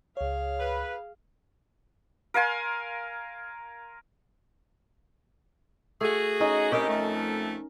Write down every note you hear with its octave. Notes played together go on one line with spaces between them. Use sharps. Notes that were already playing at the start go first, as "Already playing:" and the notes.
C#2 G#4 C#5 F5
B4
A#4 F5 G#5 C6
A3 F#4 G#4
C#4 D#4 D#5
A2 C3 C#4 D#4 G4 A#4
F2 A3